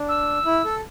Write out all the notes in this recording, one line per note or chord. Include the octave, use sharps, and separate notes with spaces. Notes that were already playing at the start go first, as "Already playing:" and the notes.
Already playing: D4
E6
E4
A4